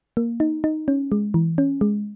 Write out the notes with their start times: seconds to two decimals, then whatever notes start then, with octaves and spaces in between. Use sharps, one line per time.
0.17 A#3
0.40 D#4
0.64 D#4
0.88 C#4
1.12 G#3
1.34 E3
1.58 C#4
1.81 G#3